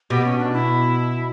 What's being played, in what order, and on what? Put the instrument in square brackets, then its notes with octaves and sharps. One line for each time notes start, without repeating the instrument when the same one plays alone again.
[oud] B2 [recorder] G4
[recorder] C#4
D4
E4